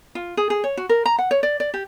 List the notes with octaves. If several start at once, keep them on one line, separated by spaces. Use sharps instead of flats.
F4
G#4
G#4
C#5
F#4
A#4
A#5
F#5
C#5
D5
D5
G4